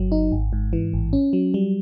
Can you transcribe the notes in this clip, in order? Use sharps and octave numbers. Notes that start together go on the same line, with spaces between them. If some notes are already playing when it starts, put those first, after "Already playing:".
Already playing: G1 F#3
D#4
G#1
G#2
E3
A1
C#4
F#3
G3